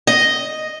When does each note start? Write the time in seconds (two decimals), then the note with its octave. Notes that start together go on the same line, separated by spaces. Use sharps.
0.07 D#5